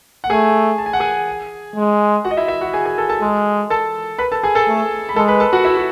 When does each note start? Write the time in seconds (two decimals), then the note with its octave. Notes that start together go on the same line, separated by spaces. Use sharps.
0.24 F#5
0.30 A3 G#4 G#5
0.78 A5
0.86 G#5
0.93 F#5
1.00 G#4 G#5
1.76 G#3
2.25 F#4 F#5
2.31 D#5
2.37 E4 E5
2.48 E4 E5
2.61 F#4 F#5
2.73 G#4 G#5
2.86 G#4 G#5
2.98 A4 A5
3.09 A4 A5
3.22 G#3
3.70 A4 A5
4.18 B4 B5
4.32 A4 A5
4.43 G#4 G#5
4.55 A4 A5
4.68 A3
5.09 B5
5.16 G#3 A4 A5
5.28 B4 B5
5.40 A4 A5
5.53 F#4 F#5
5.65 E4 E5
5.77 F#4